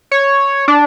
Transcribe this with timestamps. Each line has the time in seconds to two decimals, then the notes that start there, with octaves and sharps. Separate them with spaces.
0.11 C#5
0.68 D4